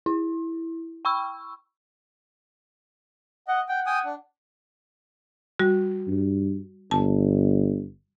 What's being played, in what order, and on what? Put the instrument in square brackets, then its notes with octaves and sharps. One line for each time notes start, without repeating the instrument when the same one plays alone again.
[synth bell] E4
G5 B5 C#6 E6
[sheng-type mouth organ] D#5 [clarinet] F#5
[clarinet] F#5 [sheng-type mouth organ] G5
[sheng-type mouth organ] G5 G#5 D#6
D4
[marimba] G3 F#4
[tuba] G2
[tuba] G1 [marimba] A5